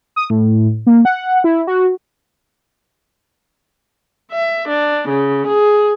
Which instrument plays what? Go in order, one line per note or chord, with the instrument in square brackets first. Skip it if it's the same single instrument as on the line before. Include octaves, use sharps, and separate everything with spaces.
[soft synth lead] D#6
A2
A#3
F#5
E4
F#4
[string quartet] E5
D4
C#3
G#4